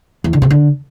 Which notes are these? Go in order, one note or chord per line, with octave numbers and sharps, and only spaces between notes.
E2
D3
C3
D3